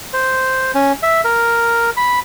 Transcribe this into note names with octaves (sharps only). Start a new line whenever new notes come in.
C5
C#4
E5
A#4
B5